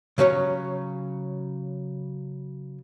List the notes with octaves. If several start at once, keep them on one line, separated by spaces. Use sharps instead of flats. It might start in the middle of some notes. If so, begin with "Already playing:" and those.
C#3 F#3 C#4 C#5